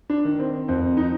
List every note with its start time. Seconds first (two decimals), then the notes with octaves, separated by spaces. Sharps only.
0.10 D4
0.25 D#3
0.39 C4
0.68 F2 C4
0.97 D#4